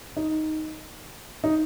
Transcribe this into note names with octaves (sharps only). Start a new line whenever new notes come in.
D#4
D#4